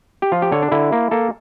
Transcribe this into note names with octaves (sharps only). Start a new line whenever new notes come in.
G4
F3 F4
G4
D3 C#5
D4
D3 E4
A#3
A#3 A4